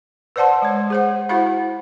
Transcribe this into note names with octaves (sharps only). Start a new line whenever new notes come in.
B4 C5 D5 F#5 A5 C6
G#3 C#5
G#4 C5 F#5
E4 F#4 C5 F5 F#5 B5